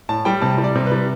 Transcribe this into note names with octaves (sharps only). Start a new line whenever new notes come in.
A2 A5
G3 G5
C3 A5
G3
D5
C3
B4
G3